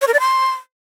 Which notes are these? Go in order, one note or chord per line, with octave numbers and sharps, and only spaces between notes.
C#5
A#4
D5
C6